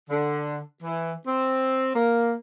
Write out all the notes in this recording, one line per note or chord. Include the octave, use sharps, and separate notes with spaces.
D3
E3
C4
A#3